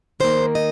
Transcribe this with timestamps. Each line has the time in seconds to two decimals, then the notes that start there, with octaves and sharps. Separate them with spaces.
0.20 D#3 A#3 C5
0.55 D#5